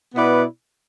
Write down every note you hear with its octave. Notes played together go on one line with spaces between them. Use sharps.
B2 B3 E4 B4 D5